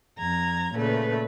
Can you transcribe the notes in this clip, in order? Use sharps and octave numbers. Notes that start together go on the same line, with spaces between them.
F2 A#5 G#6
A#2 C#3 A3 B4